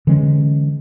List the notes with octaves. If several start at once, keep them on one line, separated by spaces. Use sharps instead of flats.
D3 E3 G#3 C#4